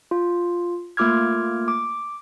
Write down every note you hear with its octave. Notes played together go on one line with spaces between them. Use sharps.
F4
A3 A#3 F4 D6 F6 G#6
D6